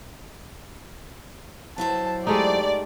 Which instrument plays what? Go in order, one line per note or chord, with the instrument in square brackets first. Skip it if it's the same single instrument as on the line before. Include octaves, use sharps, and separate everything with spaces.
[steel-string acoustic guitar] F#3 E4 C5 [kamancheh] A5
[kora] G#3 A3 D#4 [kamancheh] G4 [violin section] D5